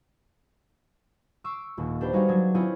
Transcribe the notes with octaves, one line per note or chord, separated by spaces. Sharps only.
C#6 D6 E6 C7 D7
D#1 D#2
D4 G4 B4 C5
G3 D#4 F#4 G#4 C#5 F5
F#3 D4 D#4 G#6
C4 E4 F4 G#4 C#5